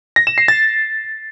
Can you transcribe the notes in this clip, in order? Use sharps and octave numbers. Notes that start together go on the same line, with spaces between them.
A#6
E7
C7
A6